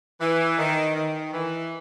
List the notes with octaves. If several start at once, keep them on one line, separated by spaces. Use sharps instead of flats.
E3
D#3
D#3
E3